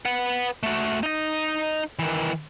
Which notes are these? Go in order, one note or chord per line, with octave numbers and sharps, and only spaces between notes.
B4 F#5
A3 F#4
D#4 D#5
D#3 E3